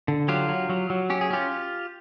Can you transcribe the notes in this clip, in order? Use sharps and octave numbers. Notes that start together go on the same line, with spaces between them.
D3
F#3 F4 G4
F#3
F#3
F#3
C#4 G4
G#4
C#4 F4 G4